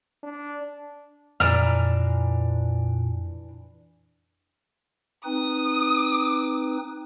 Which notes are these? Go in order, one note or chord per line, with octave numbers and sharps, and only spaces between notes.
D4
F2 A#2 E3 D4 A#5 F6
C4 D#4 B4 D#6